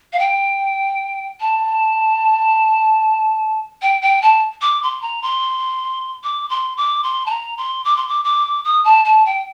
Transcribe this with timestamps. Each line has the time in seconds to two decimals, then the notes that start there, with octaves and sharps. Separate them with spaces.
0.13 F5
0.19 G5
1.40 A5
3.82 G5
4.01 G5
4.22 A5
4.61 D6
4.83 C6
5.01 A#5
5.22 C6
6.23 D6
6.49 C6
6.77 D6
7.03 C6
7.26 A5
7.30 A#5
7.57 C6
7.84 D6
7.96 C6
8.08 D6
8.24 D6
8.64 D#6
8.84 A5
9.04 A5
9.25 G5